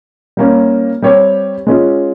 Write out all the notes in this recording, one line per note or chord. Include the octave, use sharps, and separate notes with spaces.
G3 A#3 C#4
G3 C4 G4 C#5
G#3 C#4 F4